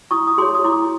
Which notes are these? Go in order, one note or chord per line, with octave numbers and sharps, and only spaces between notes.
E4 C#6 D#6
D#6
G#4 C#5 C6 D6
D#6
E4 C6 D6